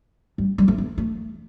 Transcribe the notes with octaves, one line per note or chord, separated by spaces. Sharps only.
G3
G3
A3
B3
A3